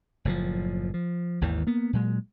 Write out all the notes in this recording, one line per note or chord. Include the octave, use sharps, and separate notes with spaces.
F#1 A2 C#3 F3
F3
G#1 D#2 D#3 E3
A#3 B3
A#2 F#3 G#3